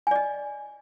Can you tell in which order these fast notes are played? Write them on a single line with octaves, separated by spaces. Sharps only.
G#5 D5 D#5